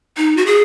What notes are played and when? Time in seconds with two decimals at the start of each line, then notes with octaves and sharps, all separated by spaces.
0.17 D#4
0.37 F#4
0.47 G#4